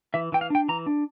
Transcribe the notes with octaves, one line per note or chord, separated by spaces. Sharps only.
E3 E5
E3 G5
F5
D4 G5
E3 A#5
D4